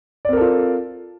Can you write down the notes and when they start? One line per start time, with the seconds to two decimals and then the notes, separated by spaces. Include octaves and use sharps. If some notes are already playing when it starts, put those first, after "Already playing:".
0.25 D5
0.29 C4
0.33 A#4
0.37 A4
0.41 F4